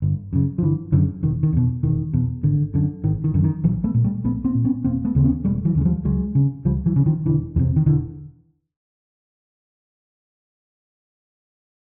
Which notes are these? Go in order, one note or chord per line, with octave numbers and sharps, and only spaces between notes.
G1
F#2 C#3
F3
G1 D3 E3
F#2 C#3 D3 E3
E1 D#3
D#3
E2 B2
E1 D#3
E2 B2
G#1 D3
F#2 D3
G#1 D#3
D#3
F#2 D3
D#3
A#1 E3 F#3
A3 B3
A#2
G3 A3
A#1 A3 B3
A#3 C4
A#2
B3 C#4
E1 A#3 C4
A3 B3
D#2 C#3 C4
B3 C#4
E1 G3 A3
E3 F#3
D#2 C#3
G#3
F3 G3
C#2 F#3 G#3
C#3
C#2 F3 G3
E3 F#3
C#3
D#3 F3
E1 D3 E3
E2 C3 D#3
D#3
E1 D3 E3